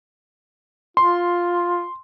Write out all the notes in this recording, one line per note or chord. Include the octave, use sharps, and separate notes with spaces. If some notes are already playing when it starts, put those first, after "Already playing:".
F4 C6